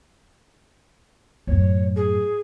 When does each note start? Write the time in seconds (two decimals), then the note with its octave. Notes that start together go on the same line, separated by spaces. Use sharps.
1.47 F#2 A2 C#5
1.96 G#4